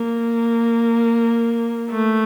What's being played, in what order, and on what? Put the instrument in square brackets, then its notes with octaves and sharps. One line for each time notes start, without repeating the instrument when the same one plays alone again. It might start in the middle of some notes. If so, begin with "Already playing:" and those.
Already playing: [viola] A#3
A3